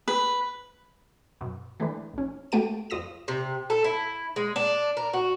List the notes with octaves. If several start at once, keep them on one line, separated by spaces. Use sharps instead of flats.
B4
F#2 B2
E3 A3 D4 B4
A#1 C#4
A3 F#4 G4 A5 D7 D#7
F2 F4 D#6 A#6 E7
C3
A4
E4
G#3
D4
A#4
F#4